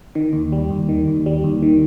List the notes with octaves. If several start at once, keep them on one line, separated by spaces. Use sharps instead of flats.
D#3
D#2
G3
D#2
D#3
D#2
G3
D#2
D#3